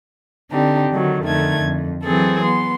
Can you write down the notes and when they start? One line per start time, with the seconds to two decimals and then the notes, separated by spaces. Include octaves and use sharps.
0.51 D3 C4 D4 D#4 G4
0.90 D3 D#3 F#3
1.24 F2 D3 D#3 A3 G#6
1.61 F2
2.04 E3 F#3 C4 G#4 A4
2.42 B3 C6